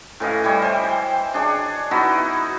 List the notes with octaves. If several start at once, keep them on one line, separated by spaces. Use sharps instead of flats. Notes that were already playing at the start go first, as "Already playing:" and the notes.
A2 E3 D#5 F5
E3 G3 C#5 D#5
C5 G#5
G5
D4 G#4 C#5
B3 D#4 E4 F#4